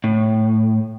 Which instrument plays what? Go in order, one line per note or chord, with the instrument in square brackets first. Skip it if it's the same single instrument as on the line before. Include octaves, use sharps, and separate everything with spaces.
[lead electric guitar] A2